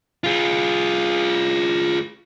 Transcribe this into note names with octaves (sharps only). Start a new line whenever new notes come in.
F4 G#4